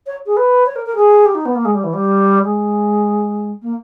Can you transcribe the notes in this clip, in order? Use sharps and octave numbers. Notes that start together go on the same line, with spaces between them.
C#5
G#4
B4
C#5
A#4
A#4
G#4
G4
D#4
B3
A#3
G#3
G3
E3
G3
G#3
A#3